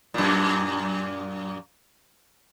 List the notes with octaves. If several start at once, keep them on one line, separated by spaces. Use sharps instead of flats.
F#2 A#2